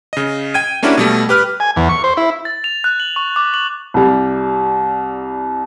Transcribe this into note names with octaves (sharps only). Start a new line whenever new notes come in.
C#3 D#5
G5 G#6 D#7
A#3 C#4 D4 E4 F#4 G4
B2 G3 A3
G4 B4 F6
G#5
E2
C#6
C5
E4
A6
F7
F#6
F#7
C#6
D6
F#7
C2 G3